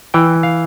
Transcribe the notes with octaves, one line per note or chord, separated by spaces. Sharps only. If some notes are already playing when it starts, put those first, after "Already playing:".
E3 G5
F5